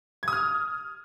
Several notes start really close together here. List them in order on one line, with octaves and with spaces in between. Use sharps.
G#6 D#6 F6